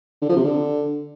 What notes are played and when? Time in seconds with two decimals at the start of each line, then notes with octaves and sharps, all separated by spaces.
0.21 D3
0.29 F3
0.36 C3
0.44 D3